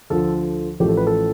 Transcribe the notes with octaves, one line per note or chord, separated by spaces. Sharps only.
D2 D3 F3 A4
A1 A2 F3 A3 G4
A4
B4
A4